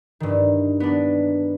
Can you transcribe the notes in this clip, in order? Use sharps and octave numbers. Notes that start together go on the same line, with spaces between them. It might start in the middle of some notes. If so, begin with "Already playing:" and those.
G2 D#3
B3 D4